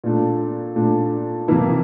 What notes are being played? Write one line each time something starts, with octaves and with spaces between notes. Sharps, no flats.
A#2 A3 D4
A#2 A3 D4
F2 C3 E3 A#3 E4